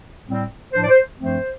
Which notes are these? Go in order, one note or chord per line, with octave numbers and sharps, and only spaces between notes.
A2 G3 C4
A2 F3 D4 C5
D5
C5
G2 F3 A3 C4 C5